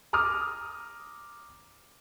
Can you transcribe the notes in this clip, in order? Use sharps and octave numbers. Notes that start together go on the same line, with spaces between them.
A#5 D6 D#6 F6